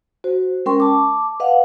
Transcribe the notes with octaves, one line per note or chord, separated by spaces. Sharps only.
F#4 C5
G#3 C#4 A#4 G5 C6 C#6
A5 D6
B4 D#5 F5 F#5